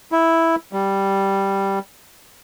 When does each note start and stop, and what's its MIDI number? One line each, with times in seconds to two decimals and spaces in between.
0.12 0.56 64
0.73 1.79 55